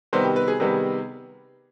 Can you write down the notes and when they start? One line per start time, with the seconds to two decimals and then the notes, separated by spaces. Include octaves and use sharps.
0.13 C3 D#3 G3 B3 C5
0.25 G4
0.36 B4
0.48 G#4
0.60 C3 D#3 G3 B3 G#4